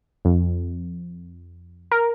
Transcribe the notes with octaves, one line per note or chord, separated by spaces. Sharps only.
F2
A#4